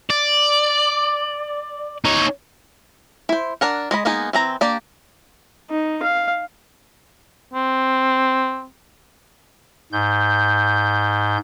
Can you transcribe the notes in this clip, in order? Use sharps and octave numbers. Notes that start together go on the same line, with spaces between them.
D5
D#4 C#5
E4 C5
D4 A#4 F#5
G#3 D#5 B5
G#3 A#3 B3 D#4 G#4
E3 C4 A#5
A#3 D4 G4 D5
D#4
F5
C4
G#2 G6